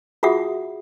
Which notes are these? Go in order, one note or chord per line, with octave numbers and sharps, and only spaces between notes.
F4 F#4 G#4 E5 F#5 D#6